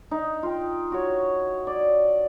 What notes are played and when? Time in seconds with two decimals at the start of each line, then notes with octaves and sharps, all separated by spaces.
0.11 D#4
0.43 F4 G5
0.92 F#4 C#5
1.67 D5